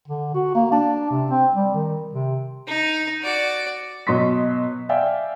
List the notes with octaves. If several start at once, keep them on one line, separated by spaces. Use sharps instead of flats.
D3
F#4
A#3
D4
C3
C4
G3
D#3
C3
D#4
F#4 D5
B2 F#3 D#5 C6 C#6 B6
D5 E5 F5 G5 G#5